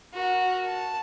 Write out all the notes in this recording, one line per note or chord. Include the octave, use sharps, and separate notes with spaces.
F#4 A#4
A5